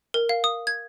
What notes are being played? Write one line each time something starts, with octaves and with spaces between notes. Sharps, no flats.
A#4
F5
D#6
G#6